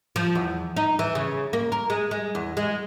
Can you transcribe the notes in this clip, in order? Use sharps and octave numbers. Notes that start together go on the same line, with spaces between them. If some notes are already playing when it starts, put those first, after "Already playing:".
F3
E2
D#4
E3
C#3
A#3
A#4
G#3
G#3
E2
G#3